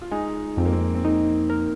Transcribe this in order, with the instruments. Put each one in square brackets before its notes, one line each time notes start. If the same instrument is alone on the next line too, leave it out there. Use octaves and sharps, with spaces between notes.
[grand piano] F4
[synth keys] G#3 [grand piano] D#4
[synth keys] F2 [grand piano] C4
[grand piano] A#3
C4
C4
[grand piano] A#3 [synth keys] D#4
[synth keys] A#4